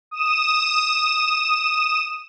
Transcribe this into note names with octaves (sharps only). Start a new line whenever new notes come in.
D#6 E7